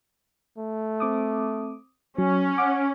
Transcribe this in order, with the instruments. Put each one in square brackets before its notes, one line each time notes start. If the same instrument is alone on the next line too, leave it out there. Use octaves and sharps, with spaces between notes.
[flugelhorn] A3
[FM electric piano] C4 D6 D#6
[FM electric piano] F#3 [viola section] C#4
[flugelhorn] F#5 [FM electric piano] D6